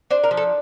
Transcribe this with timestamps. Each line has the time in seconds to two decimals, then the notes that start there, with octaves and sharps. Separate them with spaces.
0.11 D4 C5
0.24 A#4
0.31 F3
0.37 A4